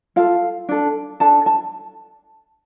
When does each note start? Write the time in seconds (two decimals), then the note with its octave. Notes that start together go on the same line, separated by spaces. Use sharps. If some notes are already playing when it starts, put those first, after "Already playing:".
0.16 F4 A4 F5
0.69 D4 A4
1.20 D4 A4 A5
1.46 A5